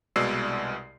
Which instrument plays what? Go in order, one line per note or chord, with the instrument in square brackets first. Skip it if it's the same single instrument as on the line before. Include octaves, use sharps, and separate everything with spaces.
[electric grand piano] C2 B2 G#3 D5 E6 C7